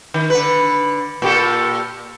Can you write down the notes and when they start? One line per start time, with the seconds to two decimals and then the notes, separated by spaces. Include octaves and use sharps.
0.14 D#3
0.30 D3 B4
1.22 A#2 G4 A4